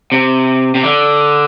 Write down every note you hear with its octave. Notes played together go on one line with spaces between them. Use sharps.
C3
C3
D3